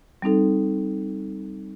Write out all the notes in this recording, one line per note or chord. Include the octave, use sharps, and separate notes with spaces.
G3 C4 D#4 A4